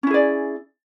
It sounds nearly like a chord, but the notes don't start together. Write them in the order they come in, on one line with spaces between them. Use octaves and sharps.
C#4 E4 G#4 D5